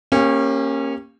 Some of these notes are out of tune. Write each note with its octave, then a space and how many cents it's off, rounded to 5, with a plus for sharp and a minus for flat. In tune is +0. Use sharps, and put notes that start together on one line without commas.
A#3 +0 C#4 -20 G4 +20